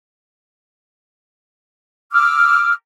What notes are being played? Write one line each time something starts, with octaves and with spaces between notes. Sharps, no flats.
D6 E6 F6